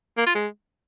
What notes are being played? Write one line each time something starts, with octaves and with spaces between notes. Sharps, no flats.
A#3
F4
G#3